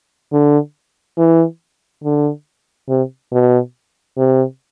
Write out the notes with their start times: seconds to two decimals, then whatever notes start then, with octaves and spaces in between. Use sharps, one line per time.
0.32 D3
1.18 E3
2.04 D3
2.89 C3
3.32 B2
4.17 C3